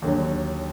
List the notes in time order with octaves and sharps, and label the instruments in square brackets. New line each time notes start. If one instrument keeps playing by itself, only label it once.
[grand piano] D#2 D3 F#3